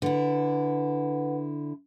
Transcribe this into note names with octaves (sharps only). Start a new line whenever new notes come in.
D3 E4 B4 F#5